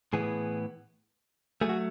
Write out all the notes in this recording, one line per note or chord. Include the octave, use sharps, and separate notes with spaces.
A2 E3 B3 G#4
F#3 A3 G#4
F#4